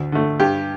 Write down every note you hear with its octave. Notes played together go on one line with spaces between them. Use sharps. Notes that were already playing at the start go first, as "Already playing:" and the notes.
Already playing: D2
D3 A3
G2 G4